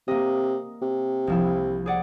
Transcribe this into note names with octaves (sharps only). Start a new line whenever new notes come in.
C3 A#3 D#5
C3
C2 F3 E4
G#4 D5 F#5